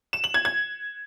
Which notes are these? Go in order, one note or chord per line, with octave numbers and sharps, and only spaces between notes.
E7
F#7
G#6
G#6